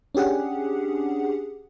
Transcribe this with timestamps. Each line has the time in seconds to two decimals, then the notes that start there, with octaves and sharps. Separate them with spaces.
0.15 C#4 D4 G4 G#4 F#5